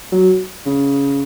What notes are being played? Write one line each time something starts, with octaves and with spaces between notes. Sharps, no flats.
F#3
C#3